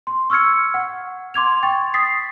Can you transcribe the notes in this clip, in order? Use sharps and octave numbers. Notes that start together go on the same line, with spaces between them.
C6
C#6 E6 F6 G#6 C#7
F#5
C6 D6 G#6 F7
G5 C#6 A6
D#6 A6 B6 C7